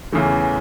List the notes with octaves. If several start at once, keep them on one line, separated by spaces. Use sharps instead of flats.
E2 C#3 E3 A3